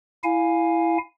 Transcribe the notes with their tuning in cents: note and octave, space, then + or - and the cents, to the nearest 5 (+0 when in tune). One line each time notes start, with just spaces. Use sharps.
E4 +10 F5 +10 G#5 +0